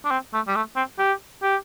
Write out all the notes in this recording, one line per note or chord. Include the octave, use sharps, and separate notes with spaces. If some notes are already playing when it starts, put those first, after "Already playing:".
D4
C4
A3
G3
A3
C4
G4
G4